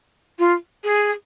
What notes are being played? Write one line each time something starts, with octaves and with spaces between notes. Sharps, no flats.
F4
G#4